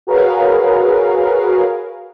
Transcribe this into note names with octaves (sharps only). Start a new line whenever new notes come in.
F#4 G#4 A#4 B4 C#5 F5